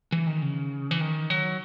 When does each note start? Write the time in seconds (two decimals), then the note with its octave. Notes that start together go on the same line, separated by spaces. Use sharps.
0.12 E3
0.27 D#3
0.42 C#3
0.91 E3
1.01 D#3
1.30 F#3